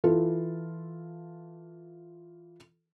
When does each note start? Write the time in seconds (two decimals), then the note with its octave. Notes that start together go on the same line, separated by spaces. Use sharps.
0.04 E3 F4 A4